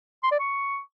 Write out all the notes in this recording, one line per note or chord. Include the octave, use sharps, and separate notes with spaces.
C6
D5
C#6